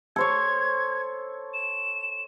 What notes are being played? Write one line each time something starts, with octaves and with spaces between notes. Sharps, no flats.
A4 C5 C#5 G#6
E7